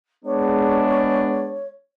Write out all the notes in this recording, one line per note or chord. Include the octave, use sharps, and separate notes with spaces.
G#3 B3 D4 C#5